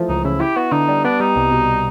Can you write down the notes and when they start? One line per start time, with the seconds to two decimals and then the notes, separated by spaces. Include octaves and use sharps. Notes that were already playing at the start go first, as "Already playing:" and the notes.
Already playing: E3 F3 A3
0.09 C#2 D#4
0.24 C#3 E4
0.40 E4 G4
0.56 B3 F#4
0.72 D3 D#4
0.89 G3
1.04 B3 D4
1.20 G3 D#4
1.36 C2
1.51 B2